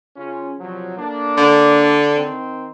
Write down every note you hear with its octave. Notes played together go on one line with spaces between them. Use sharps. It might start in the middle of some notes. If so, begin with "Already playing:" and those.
C#3 C#4 F4
C2 F3 F#3
A3 A#3 D4
D3
D#3 C4